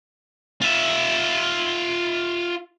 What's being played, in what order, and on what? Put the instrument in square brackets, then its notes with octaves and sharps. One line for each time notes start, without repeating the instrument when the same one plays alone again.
[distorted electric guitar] F4 E5